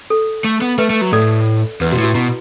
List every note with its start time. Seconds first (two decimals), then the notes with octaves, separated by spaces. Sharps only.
0.10 A4
0.44 A3
0.62 B3
0.78 A3 B4 E5
0.90 A3
1.02 F#3
1.12 A2 A4 D5
1.81 E2 B4
1.92 B2 F#4
1.98 A2
2.04 F#4
2.15 B2 E4